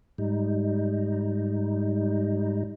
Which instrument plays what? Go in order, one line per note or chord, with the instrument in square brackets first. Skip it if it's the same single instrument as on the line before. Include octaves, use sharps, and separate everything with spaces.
[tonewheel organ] G#2 G3 D#4